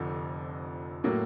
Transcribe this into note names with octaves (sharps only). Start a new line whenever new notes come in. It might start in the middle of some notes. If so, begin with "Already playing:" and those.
Already playing: F1 F2 D3 F3
A2 F#3 A#3